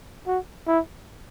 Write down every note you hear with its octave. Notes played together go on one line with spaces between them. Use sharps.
F#4
E4